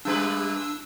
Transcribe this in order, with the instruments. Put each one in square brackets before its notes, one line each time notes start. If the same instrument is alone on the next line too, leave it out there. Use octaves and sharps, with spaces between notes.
[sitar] A#2 G3 B4 [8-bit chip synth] D4 E6